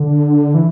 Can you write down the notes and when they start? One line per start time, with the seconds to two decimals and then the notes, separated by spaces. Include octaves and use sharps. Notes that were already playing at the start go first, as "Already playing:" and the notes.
Already playing: D3
0.54 E3